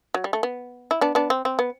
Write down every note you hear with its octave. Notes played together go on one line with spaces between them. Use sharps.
F#3
G3
A3
B3
E4
B3 D4
B3 D4
C4
C4
B3